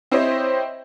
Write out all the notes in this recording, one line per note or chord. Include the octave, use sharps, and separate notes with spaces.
C4 E4 G4 C5 C#5 D#5